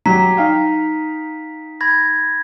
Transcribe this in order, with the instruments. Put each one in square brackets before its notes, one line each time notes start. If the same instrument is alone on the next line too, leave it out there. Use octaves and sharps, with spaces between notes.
[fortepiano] F#3 G4 [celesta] A#5 [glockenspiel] B6
[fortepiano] D#4 F5 G5
[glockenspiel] B5 G#6 A#6